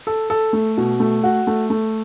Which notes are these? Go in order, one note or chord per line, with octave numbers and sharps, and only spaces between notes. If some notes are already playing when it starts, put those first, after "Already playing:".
A4
A4
A3
B2
A3
F#4
A3
A3